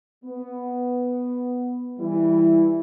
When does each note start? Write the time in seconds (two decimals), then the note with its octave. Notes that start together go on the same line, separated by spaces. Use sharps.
0.24 B3
1.99 E3 G3 E4